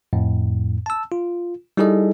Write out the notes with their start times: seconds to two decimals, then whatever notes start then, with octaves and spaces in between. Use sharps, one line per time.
0.13 F2 A2
0.86 A5 E6
1.12 F4
1.77 G3 D#4 E4 G#4 A4 D#5